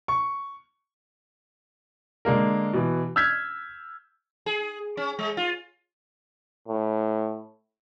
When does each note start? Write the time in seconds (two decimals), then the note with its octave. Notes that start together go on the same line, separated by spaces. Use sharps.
0.08 C#6
2.25 D3 G#3 A#3 A#4
2.73 B2 E3
3.16 E6 F6 G6 G#6 B6
4.46 G#4
4.97 C#4
5.19 G#3
5.37 F4
6.68 A2